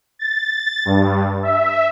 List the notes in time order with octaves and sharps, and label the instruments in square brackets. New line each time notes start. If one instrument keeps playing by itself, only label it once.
[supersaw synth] A6
G2
E5